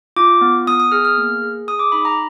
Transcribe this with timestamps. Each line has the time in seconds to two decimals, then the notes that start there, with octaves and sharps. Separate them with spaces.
0.16 F4 D6
0.41 B3
0.67 B3 D#6
0.80 D#6
0.92 G#4 F6
1.05 F6
1.18 A#3
1.42 G#4
1.68 G#4 D#6
1.79 D6
1.92 D#4 B5
2.05 A#5